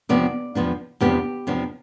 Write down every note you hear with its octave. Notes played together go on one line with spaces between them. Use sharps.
E2 C3 F3 B3 D4 D5
E2 C3 F3 B3 D4
E2 C3 F3 B3 D4 G4
E2 C3 F3 B3 D4